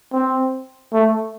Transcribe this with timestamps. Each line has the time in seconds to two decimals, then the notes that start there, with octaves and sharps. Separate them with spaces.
0.13 C4
0.93 A3